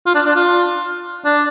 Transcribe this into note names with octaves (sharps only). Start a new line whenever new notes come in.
F4
D4
D4
F4
D4